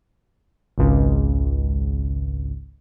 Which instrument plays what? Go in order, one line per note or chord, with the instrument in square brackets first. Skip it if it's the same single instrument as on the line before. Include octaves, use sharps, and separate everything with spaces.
[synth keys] G#1 C#2